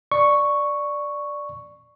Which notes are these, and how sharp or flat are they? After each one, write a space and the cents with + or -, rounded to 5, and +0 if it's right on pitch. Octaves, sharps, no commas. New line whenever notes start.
D5 +0 C#6 +0